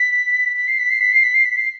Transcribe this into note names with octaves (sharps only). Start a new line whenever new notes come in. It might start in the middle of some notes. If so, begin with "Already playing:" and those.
Already playing: B6
B6
C7
B6
C7
B6
C7
B6
C7
B6
C7